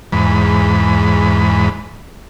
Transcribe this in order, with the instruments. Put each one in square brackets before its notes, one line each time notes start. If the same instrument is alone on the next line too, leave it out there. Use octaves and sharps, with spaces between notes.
[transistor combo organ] E2 G#2 B5